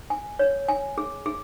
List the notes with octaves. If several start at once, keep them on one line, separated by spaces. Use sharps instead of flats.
G#5
C#5
G#5
G#4
G#4